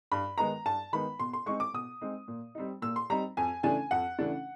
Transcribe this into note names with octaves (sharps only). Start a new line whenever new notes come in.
G2 B5
D#3 G#3 B3 D#4 A#5
G2 A5
D#3 G#3 B3 D#4 B5
B2 C6
C6
G#3 C4 D#4 C#6
D6
B2 D#6
G#3 C4 D#4
A#2
G3 C4 D#4
A#2 E6
C6
G3 C4 D#4 A#5
F2 G#5
C#3 E3 A3 D4 G#5
F2 F#5
C#3 E3 A3 D4